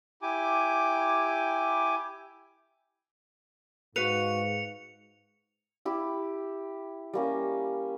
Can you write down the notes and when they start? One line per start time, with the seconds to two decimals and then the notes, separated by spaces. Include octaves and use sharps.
0.22 E4 G4 G#5 D6
3.96 G#2 F#4 B4 F5 C#7 F7
5.85 E4 G4
7.13 G3 A#3 C#4